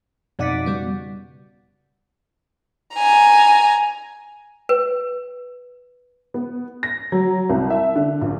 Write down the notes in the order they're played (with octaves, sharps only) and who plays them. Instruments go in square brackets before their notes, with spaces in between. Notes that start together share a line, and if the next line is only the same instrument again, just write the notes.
[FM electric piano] F2 D#4 B6 [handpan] B2 D5 F#5
[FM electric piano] C#3 G3 B3
[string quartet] G#5 A#5
[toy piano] B4
[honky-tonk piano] B3
A#6
F#3
C2
E5
D3
A#1